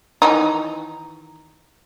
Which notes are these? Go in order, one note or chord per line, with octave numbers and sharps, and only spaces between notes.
D#3 E3 D#4